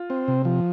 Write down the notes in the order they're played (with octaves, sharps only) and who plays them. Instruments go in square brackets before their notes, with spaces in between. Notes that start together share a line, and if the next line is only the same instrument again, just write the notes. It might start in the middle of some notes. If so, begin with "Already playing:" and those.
Already playing: [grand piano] F4
[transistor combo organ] C4
C3
F3